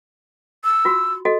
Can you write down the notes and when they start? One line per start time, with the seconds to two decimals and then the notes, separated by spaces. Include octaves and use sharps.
0.64 E6
0.85 F4 F#4
1.25 F#4 A4 D#5